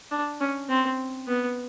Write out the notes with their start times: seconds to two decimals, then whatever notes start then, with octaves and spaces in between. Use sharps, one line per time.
0.11 D4
0.41 C#4
0.69 C4
1.28 B3